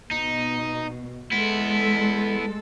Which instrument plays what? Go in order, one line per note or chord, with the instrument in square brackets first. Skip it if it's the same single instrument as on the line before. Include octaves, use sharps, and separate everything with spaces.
[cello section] B2 [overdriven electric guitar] D#4
[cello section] G#3 A4 [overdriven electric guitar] B3 E4